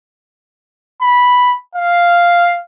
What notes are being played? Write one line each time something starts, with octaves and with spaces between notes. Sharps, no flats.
B5
F5